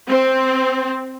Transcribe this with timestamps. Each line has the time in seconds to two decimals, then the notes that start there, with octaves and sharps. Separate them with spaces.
0.08 C4